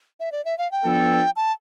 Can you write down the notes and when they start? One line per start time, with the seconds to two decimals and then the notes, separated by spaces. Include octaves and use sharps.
0.20 E5
0.32 D5
0.45 E5
0.58 F5
0.72 G5
0.84 F3 B3 D4 A4
1.36 A5